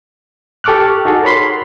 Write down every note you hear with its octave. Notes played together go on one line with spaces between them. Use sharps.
G4 A4 C#6 D6 F6 F#6
D#4 F#4 G#4 A4
A#4 C#5 B5 C6